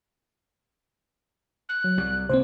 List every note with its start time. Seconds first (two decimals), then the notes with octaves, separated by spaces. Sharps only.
1.69 F#6
1.84 F#3
1.98 C2 C3 G3
2.29 C3 A#3 C4 C5